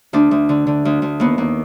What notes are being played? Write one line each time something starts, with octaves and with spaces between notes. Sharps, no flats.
D2 D4
D2
D3
D3
D2
D2
D#2 B3
D#2